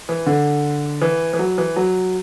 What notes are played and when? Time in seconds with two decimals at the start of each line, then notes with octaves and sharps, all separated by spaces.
0.09 E3
0.26 D3
1.02 E3
1.33 E3
1.39 F#3
1.58 E3
1.76 F#3